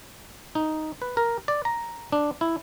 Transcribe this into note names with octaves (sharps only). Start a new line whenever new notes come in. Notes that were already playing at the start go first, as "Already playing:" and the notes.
D#4
B4
A#4
D5
A#5
D4
E4